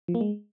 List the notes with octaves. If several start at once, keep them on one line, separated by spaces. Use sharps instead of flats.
F3
A#3
G#3